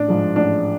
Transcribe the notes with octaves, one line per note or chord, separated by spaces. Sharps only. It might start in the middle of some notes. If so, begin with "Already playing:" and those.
Already playing: A1 D4
G#2 F3 G#3
A1 D4